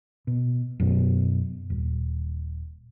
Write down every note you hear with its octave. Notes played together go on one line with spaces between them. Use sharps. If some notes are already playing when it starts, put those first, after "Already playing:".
B2
F#2 B2
D#1